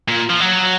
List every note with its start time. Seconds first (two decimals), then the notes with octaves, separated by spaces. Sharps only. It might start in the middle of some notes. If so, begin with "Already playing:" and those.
0.08 A#2
0.30 F3
0.40 F#3